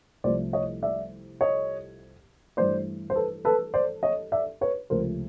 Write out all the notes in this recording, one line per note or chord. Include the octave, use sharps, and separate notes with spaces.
C2 C3 F3 A3 C5 D5
C#5 D#5
D5 E5
C#5 D#5
G2 E3 A3 C5 D5
C5
A4 B4
A4 B4
C5 D5
C#5 D#5
D5 E5
B4 C#5
C#2 C3 F3 A3 A#4 C5